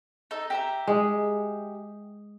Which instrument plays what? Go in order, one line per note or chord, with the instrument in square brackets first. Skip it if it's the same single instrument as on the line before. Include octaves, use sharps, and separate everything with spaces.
[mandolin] D#4 A4
G4 E5 A#5
[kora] G#3